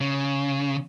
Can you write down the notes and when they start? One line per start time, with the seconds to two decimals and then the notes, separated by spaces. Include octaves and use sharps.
0.01 C#3